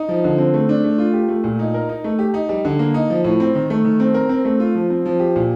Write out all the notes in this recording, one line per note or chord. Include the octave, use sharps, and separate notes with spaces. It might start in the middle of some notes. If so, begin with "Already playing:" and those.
Already playing: D#4
F3
D3
C4
A3
D4
A3
F4
G4
A3
A#2
D#4
A#4
D#4
A3
G4
D#4
G3
D3
A#3
D#4
F3
A2
C4
D#3
A3
D#3
C4
A#4
C4
A3
F4
F3
C4
F3
G4
A#2